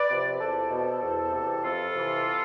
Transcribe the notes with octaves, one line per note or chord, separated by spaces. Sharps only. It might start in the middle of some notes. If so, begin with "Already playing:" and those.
Already playing: B4 D5
C3 F3
E2 A4 C5
B2
E2
C3 E3
F2 F4 A4
C3 E3